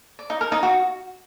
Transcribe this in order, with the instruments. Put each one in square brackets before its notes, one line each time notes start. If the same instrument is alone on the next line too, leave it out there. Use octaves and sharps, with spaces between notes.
[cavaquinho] D5
D#4
A#4
D#4
F#4